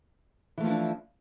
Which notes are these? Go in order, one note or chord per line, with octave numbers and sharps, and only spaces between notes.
E3 F3 A3 D4 E4